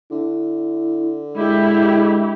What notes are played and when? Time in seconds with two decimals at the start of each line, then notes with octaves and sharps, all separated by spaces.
0.11 D3 E4
1.37 G#3 E4 G4